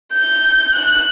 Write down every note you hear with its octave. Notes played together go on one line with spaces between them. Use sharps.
G6
F#6